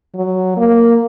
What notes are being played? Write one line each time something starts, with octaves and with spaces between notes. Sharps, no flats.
F#3
A#3